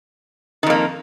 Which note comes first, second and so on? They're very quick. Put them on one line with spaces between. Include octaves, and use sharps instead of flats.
D#3 F2 A#3